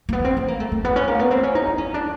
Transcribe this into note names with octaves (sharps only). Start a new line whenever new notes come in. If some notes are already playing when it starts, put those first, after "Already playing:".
A#3
B3
C4
C4
A#3
A3
A3
B3
C#4
A#3
B3
C4
C#4
D#4
D#4
C#4
D4